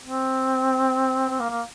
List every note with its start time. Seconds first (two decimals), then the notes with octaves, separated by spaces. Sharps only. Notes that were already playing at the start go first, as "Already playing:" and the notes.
0.03 C4
1.29 C4
1.39 A#3
1.50 A#3